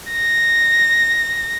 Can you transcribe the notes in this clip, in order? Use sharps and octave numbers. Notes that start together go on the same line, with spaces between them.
A#6